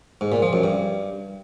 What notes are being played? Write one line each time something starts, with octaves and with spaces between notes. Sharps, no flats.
G#2
A#2
F3
F#2
G2